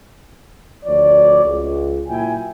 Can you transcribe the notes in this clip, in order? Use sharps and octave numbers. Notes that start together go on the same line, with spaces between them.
D2 F3 C#5 D5
C#2
A#2 F#3 E4 G5 G#5